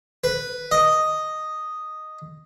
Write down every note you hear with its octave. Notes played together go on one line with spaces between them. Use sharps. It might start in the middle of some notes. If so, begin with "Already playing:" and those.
B4
D#5